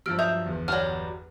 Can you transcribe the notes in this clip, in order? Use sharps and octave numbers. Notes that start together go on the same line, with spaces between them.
G2 F3 F#3 E6 F6 D7
E5 D#6 G6 F7
G1 E2
F#3 G3 F6